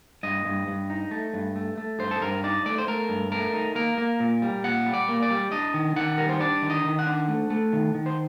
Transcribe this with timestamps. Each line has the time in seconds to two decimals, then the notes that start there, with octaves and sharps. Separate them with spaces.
0.23 G2 D#5
0.45 G2
0.68 G2
0.90 D#4
1.11 A3
1.34 G2
1.56 A3
1.78 A3
1.99 G2 C5
2.11 A4
2.21 G2 A#4
2.44 D#4 D5
2.66 A3 D5
2.78 C5
2.88 A3 A#4
3.09 G2
3.32 A3 A#4
3.53 D#4
3.75 A#3 A#4
3.98 A#3
4.20 A#2
4.42 G3
4.64 A#2 F#5
4.86 G3
4.94 D5
5.08 A#3
5.22 D5
5.30 G3
5.52 D4 D#5
5.74 D#3
5.96 D#3 F#5
6.18 G3 A#4
6.29 C5
6.40 D4 D5
6.62 D#3
6.70 D#5
6.84 D#3
6.99 F#5
7.07 D4
7.28 A3
7.50 A3
7.73 D#3
7.94 D#3
8.06 C5